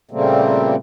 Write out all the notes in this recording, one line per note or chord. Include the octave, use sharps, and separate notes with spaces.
A#2 C#3 G3 A3 A#3 C4